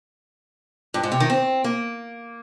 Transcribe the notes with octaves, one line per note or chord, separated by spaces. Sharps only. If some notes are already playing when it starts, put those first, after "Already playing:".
G2
G#2
C3
D#3
C4
A#3